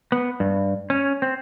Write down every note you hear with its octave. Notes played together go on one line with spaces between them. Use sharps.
B3
G2
C#4
C4